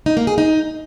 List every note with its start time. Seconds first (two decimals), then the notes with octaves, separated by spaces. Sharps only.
0.06 D#4
0.17 A#3
0.27 G#4
0.38 D#4